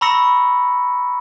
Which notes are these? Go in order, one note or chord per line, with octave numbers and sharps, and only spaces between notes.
A#5 B5 C#6 E6 A#6 C#7